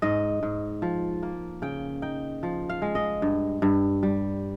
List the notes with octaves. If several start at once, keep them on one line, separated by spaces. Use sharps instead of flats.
G#2 D#5
G#2
F3
A#3
C#3 G5
D#4 G5
F3
F5
G#3
D#5
G2
G2
G3